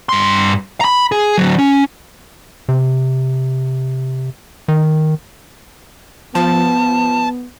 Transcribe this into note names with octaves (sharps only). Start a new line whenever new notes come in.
G2 C6
A#5 B5
G#4
D2 F#3
C#4
C3
D#3
F3 B3 A5